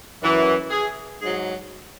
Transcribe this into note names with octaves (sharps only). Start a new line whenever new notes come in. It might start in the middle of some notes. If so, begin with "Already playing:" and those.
F#2 E3
G#4
G#2 F#3 G#4